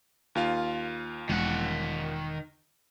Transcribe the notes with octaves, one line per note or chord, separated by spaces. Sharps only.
D#2 F4 F5
E1 D#3 F#5